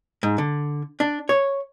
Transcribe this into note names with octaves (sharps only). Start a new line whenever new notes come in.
G#2
D3
D4
C#5